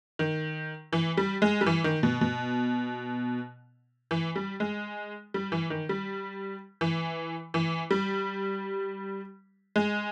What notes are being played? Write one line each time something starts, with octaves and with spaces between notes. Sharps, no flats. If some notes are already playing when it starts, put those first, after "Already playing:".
D#3
E3
G3
G#3
G3
E3
D#3
B2
B2
E3
G3
G#3
G3
E3
D#3
G3
E3
E3
G3
G#3